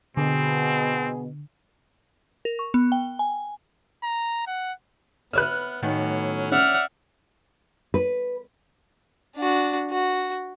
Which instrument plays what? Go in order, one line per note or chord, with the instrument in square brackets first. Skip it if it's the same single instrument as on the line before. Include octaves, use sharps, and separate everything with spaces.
[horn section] B2 [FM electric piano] D3 [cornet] C4 [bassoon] G#4
[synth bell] A#4
C#6
B3
G5
G#5
[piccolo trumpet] A#5
F#5
[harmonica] B3 [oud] B4 C#5 E5 [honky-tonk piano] F6 F#6
[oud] A2 D#3 B3 [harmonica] F#3 C#4
[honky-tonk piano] C#4 [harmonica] D5 E5 [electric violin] F#5 F6
[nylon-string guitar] B4
[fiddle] D4 F#4
F#4